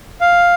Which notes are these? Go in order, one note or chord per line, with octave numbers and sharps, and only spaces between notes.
F5